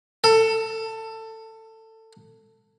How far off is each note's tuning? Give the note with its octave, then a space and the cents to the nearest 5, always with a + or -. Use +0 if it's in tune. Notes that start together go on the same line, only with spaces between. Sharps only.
A4 +20